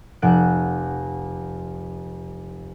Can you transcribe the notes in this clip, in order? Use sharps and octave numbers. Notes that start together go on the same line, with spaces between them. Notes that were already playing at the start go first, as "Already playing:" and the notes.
F1 F#5 F#6 D7